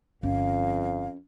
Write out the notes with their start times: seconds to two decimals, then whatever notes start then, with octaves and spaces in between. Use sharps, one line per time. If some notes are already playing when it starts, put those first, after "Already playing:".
0.23 G1 F2 C#4 F5